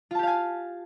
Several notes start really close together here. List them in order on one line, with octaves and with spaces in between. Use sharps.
F4 A5 G4 F5 G#5